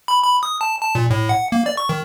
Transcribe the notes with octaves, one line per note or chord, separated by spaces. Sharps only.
B5
B5
D#6
A5
A5
A#2
A2
F#5
A#3
D5
C#6
D#3